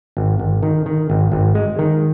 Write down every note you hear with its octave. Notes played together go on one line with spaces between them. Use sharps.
G#1
G#1
D#3
D#3
G#1
G#1
G#3
D#3